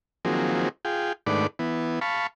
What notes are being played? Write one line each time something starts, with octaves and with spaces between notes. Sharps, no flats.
D#3 F3 F#3 A#3 C4 G#4
F4 G#4 G5
G#2 D#3 A3 D4 B4 D5
E3 B3
F5 A5 B5 C#6